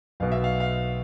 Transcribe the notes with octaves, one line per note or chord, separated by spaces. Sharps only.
B1 B2 F5
E5
F5
F5